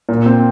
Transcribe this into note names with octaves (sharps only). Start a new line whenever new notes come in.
A#2
C4